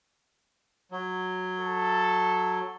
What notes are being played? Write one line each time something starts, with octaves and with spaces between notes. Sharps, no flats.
F#3
A4